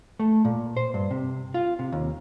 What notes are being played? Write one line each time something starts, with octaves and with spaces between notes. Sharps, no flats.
A3
A#2
C5
G2
C3
F4
C3
D#2